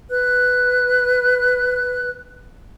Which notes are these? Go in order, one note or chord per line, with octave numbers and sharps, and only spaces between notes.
B4 F#6